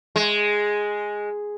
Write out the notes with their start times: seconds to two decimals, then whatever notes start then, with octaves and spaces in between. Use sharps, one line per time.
0.16 G#3